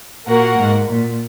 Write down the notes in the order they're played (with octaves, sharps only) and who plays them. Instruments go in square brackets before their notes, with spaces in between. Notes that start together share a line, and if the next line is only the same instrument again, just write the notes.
[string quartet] A#2 [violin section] A#3 F#4 A#4 F#5
[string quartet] G#2
A#2